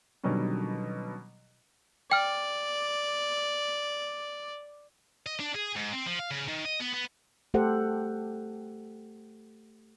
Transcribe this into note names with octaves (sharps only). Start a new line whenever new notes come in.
B2 D3 D#3 F#3 G3 C#4
D5 G5 F6
D#5
D4
G#4
G#2
C4
F3
F5
C#3
D#3
D#5
B3
B3
A3 G4 A4 C5 F#5